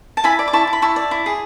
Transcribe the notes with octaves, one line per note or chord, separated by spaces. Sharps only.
A5
E4 G#5 B5
D5
D6
E4 A5 C#6
E4
B5
E4 A5 C#6
D5
E4
G#4